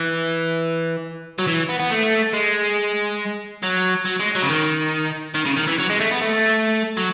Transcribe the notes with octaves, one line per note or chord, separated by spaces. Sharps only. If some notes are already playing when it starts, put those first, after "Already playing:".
Already playing: E3
F#3
E3
B3
B3
A3
G#3
F#3
F#3
G#3
F#3
C#3
D#3
D#3
C#3
D#3
E3
F#3
G#3
A3
B3
A3
F#3